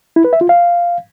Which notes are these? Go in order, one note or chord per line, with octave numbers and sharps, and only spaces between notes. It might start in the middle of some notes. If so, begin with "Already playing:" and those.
E4
B4
E5
F4
F5